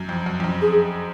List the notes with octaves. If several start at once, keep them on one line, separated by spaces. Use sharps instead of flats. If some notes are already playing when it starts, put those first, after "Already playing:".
Already playing: F#2
F2
F#2
F2
F#2
G#4